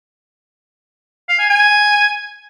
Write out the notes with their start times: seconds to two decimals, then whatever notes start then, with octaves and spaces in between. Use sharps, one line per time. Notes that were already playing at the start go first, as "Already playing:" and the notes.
1.29 F5
1.39 G#5
1.49 G#5